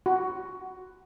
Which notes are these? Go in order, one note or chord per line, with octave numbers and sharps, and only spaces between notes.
F#4